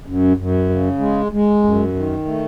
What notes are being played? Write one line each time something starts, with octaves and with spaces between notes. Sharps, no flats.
F#2
F#2
C#3
G#3
G#3
F#2
D#3
A3